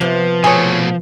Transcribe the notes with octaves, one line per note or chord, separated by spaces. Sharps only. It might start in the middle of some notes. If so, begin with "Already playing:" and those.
C3 F3 B3
B2 A3 G#4 C#5